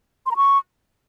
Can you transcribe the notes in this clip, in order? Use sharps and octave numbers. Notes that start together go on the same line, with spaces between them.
C6
A#5
C#6